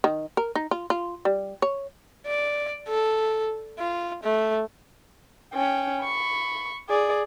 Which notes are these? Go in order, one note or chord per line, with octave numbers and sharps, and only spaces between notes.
D#3
A#4
D#4
F4
F4
G3
C#5
D5
A4
F4
A3
C#4 G5
B5 C#6
G#4 D5